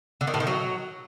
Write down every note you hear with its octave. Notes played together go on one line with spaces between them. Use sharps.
D3
D#3
A2
D#3
F#3